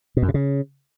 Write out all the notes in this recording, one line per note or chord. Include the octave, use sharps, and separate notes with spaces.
B2
F#2
C3
C#3